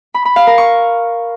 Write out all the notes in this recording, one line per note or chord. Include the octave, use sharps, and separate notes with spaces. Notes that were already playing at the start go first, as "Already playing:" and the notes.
B5
B5
F5
A#4
C#6